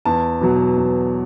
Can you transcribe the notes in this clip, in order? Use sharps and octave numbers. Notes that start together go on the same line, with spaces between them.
E2 A5
B2 F#3
E2